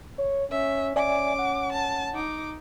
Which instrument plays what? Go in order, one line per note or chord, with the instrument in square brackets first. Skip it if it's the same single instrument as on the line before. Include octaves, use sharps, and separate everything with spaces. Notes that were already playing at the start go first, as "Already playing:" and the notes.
[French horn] C#5
[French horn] C#4 [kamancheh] E5
[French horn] C#4 [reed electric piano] D5 E5 G#5 [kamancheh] D6
[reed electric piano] F#5
[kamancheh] A5
D#4 D6